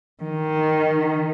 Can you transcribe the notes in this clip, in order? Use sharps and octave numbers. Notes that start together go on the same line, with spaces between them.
D#3